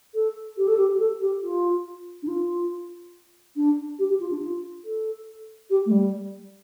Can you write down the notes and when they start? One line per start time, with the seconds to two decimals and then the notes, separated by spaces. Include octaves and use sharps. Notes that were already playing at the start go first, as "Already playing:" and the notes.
0.14 A4
0.57 G4
0.67 A4
0.77 G4
0.94 G4
1.00 A4
1.21 G4
1.42 F4
2.23 D4
2.28 F4
3.56 D4
3.99 G4
4.09 G4
4.20 F4
4.31 D4
4.42 F4
4.84 A4
5.70 G4
5.86 A3
5.91 G3